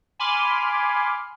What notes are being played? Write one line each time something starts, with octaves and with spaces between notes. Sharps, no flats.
G#5 B5 C6 D6 F6